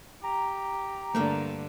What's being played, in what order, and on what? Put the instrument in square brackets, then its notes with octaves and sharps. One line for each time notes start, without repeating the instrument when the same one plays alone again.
[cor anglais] G4 [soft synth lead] A#5
[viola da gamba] G2 D3 [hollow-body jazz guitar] A3 A#3 E5